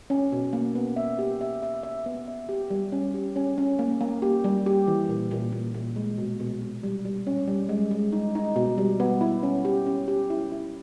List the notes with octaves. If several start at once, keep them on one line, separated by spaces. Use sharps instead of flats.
C#4
B2
A#3
B3
E5
G4
E5
E5
E5
B3
E5
G4
G3
C#4
G4
C#4
C#4
A#3
A#3
G4
G3
G4
E3
A#2
A#2
A#2
A#2
G#3
B2
B2
B2
G3
G3
C#4
G3
G#3
G#3
D#4
D#4
B2
G3
B3
E4
C#4
G4
C#4
G4
E4
E4